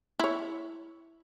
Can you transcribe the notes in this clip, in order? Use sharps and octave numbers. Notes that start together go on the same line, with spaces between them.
E4 C#5